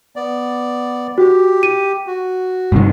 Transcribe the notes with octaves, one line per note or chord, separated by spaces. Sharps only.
B3 D5
F#4 G4
D#7
F#4
G2 C3 D#3